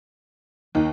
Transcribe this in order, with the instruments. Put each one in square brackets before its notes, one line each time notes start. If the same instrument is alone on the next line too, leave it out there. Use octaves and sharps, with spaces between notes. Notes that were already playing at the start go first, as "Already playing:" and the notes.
[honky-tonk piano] D#2 [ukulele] D#4